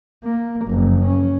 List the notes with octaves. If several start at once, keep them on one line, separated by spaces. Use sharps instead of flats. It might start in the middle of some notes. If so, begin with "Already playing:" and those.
A#3
F#1 F2
C#4